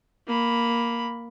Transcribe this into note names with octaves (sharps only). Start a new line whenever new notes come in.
A#3 B5